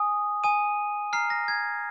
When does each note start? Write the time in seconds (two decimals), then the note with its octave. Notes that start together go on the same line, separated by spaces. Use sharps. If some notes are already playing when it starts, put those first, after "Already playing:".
Already playing: G#5 D#6
0.44 G#5 D#6 D#7
1.13 A#5 F6 C7
1.30 A#6
1.48 G#6